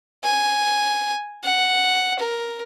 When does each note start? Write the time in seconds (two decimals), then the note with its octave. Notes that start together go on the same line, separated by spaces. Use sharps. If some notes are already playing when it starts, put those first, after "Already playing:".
0.24 G#5
1.44 F#5
2.19 A#4